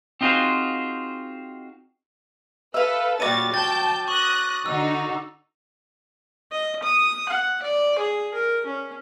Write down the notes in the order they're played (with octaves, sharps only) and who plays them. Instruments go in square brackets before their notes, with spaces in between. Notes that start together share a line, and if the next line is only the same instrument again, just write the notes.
[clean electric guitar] C4 D#4 F4 F#4 G#4 C5
[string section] A4 B4 [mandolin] E5 F5
[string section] A#2 G3 A6 [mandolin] C#4 D#4 F#4 [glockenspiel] D6 D#7
[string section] G5 A5 G6 [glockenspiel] A6
[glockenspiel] C#6 [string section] D#6 F#6 A#6
[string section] D3 D#4 F#4 [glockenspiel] E6
[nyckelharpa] D#5
D#6
F#5
D5
G#4
A#4
C#4